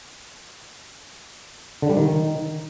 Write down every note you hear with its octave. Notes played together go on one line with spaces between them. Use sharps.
D3
G3
D#3